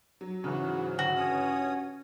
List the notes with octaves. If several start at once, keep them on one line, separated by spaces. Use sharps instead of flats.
F#3
G#2 C#3 E3 F#3 F#4
D3 F#4
G2 C#4 C#5 D#6